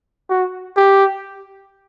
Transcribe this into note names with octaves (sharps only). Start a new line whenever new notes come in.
F#4
G4